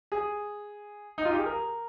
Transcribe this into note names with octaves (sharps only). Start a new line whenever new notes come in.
G#4
D#4
F4
G4
G#4
A#4